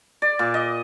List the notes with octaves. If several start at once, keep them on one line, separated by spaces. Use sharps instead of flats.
D5
A#2
D#5